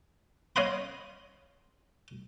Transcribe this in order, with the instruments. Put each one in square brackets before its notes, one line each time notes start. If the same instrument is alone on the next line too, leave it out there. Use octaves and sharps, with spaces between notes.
[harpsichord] C#5 D#5 F5 F#5 B5 C6